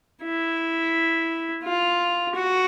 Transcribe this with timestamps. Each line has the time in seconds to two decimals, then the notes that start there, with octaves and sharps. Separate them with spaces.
0.24 E4
1.64 F4
2.35 F#4